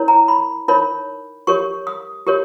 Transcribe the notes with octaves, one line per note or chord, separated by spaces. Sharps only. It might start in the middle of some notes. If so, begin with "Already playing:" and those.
Already playing: E4 A#4 C#5
A#5
B5
D#4 A#4 C#5 B5
G4 A#4 C#5 C#6
D#6
G4 A#4 C#5